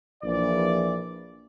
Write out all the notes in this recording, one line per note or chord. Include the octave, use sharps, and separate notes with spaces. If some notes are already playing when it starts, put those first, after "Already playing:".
A#1 E3 D5